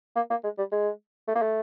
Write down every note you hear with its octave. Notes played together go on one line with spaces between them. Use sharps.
A#3
A#3
G#3
G3
G#3
A3
A#3
A3